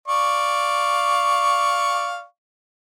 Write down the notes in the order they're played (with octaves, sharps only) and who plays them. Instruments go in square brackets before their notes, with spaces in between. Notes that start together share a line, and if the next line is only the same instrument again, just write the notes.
[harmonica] D5 F5 C#6